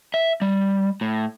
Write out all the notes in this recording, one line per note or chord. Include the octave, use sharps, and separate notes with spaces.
E5
G3
A2